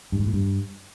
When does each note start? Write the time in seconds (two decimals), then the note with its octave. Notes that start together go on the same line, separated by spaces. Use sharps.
0.12 G2
0.19 G#2
0.26 A2
0.33 G2